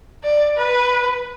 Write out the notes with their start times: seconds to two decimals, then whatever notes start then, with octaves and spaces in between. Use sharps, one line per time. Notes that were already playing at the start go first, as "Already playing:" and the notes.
0.24 D5
0.57 B4